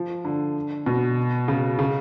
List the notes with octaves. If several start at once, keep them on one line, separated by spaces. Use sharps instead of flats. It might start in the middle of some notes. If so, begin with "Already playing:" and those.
Already playing: F3
D3
B2
C#3
C#3